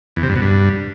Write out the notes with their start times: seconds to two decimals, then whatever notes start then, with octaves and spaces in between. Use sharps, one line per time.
0.16 E2
0.23 C3
0.29 G2
0.36 B2
0.42 G2